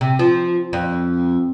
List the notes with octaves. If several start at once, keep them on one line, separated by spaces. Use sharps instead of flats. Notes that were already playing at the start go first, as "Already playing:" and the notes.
C3
F3
F2